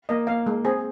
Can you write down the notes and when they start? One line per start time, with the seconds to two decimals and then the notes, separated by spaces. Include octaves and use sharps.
0.09 A#3 D#5
0.27 A#3 F5
0.46 G#3
0.65 C4 G#4